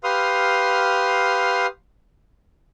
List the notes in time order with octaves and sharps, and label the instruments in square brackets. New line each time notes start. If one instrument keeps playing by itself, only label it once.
[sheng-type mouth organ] G4 B4 F5 C6 D#6 F6